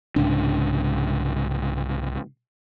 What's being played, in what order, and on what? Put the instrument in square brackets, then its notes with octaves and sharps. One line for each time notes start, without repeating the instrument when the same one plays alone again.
[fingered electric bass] C2 G#2 C#3 D4